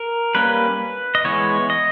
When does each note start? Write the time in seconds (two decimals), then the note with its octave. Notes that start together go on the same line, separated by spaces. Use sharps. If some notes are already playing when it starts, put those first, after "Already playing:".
Already playing: A#4
0.35 G3 A#3 C#4 B4
1.15 D#5
1.25 E3 G#3 B3 C#5
1.70 D#5